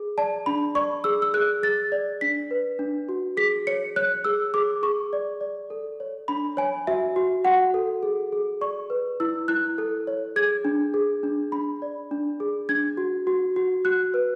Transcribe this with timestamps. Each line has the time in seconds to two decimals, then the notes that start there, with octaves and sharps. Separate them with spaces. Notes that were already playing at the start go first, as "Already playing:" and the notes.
Already playing: G#4
0.18 D5 A5
0.46 D4 B5
0.75 D5 C#6
1.04 G#4 E6
1.22 E6
1.34 G#4 F#6
1.63 G#4 A6
1.92 D5
2.21 D4 B6
2.51 B4
2.79 D4
3.09 F#4
3.37 G#4 B6
3.67 C#5 C#7
3.96 C#5 F#6
4.24 G#4 E6
4.54 G#4 D6
4.83 G#4 C#6
5.13 D5
5.41 D5
5.70 A4
6.00 C#5
6.28 D4 B5
6.57 C#5 G#5
6.87 F#4 E5
7.16 F#4
7.45 F#4 F#5
7.74 A4
8.03 G#4
8.32 G#4
8.61 D5 C#6
8.90 B4
9.20 E4 E6
9.48 E4 F#6
9.78 A4
10.07 C#5
10.36 G#4 G#6
10.65 D4
10.94 G#4
11.23 D4
11.52 D4 B5
11.82 D5
12.11 D4
12.40 G#4
12.69 D4 G#6
12.97 F#4
13.27 F#4
13.56 F#4
13.85 F#4 F#6
14.14 B4